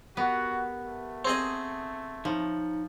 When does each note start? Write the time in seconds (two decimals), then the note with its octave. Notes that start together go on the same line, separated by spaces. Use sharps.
0.17 B3 F#4 G4 A#4 B4
0.85 A3
1.25 C4 G#4 D#5
2.25 F3 D#4 C#5